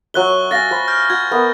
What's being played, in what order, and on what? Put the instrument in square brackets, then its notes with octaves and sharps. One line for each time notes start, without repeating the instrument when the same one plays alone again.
[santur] F#3 C#5 E5 [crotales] C#6 F#6 G7
[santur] F5 F#5 G#5 [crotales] A6 A#6
[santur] C5 B5
[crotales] F6 G6
[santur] F#4 [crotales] G#6
[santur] B3 A#4 E5